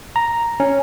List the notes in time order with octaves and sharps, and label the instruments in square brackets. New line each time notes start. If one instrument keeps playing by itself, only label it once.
[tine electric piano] A#5
C#4